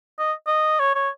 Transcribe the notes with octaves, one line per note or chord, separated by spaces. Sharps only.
D#5
D#5
C#5
C#5